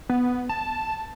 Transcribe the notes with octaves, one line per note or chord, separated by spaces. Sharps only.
B3
A5